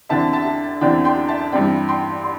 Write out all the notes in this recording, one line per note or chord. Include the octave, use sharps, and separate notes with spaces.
E2 D3 C4 E5 A5
E5 A5
E2 D3 C4 D5 G5
G5 C6
E5 A5
G2 E3 G3 C4 D5 G5
G5 C6
C6